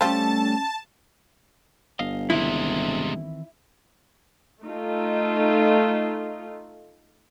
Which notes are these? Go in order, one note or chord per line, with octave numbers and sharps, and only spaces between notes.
G3 A3 C4 C#4 F4 G4 A5
G1 D#5 F5
C3 D#3 E3 G#3 C4 E4
A3 D#4 F4